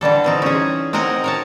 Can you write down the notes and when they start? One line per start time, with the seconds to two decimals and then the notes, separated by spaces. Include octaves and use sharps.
0.01 D3 E3 G3 A4
0.24 E3 C4 D#4
0.42 C#4 G#4
0.93 C4 D#4 A#4 D#5 F#5 G#5
1.24 A#4 C#5 A5